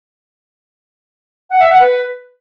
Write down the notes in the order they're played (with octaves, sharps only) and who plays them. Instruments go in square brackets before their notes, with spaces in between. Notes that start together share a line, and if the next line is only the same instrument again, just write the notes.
[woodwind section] F#5
E5
F#5
B4